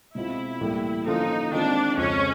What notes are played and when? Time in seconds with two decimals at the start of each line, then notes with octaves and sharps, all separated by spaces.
0.15 B2 G#3 C4 E4 F4
0.61 A2 E3 G3 A#3
1.06 D3 F3 A#3 C#4 D#4 F4
1.52 D#3 G#3 C4 D4 F4
1.97 F2 C#3 F3 G#3 C#4